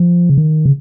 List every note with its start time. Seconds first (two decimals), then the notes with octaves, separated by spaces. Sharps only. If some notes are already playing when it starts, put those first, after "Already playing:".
Already playing: F3
0.29 C#3
0.38 D#3
0.66 C#3